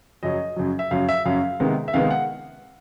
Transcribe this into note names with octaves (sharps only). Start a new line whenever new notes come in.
F#2 C#3 F#3 D#5
F#2 C#3 F#3
E5
F#2 C#3 F#3 F5
E5
F#2 C#3 F#3 F5
C3 D#3 G#3 B3
E5
C3 D#3 G#3 B3 F5
F#5